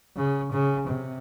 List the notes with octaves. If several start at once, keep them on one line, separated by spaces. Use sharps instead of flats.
C#3
C#3
C3